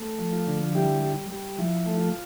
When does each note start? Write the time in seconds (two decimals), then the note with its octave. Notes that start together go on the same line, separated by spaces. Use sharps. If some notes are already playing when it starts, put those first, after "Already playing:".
Already playing: A3
0.19 F3
0.33 F4
0.47 D3
0.74 G3 E4 G4
1.03 G3
1.30 G3
1.58 F3 E4
1.86 A3
1.99 F4